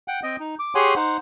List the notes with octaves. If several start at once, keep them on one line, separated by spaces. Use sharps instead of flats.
F#5 G5
C4 D#5 G5
D#4
D6
G4 G#4 C#5 F#5 G#5 C6
D#4 C5 F#5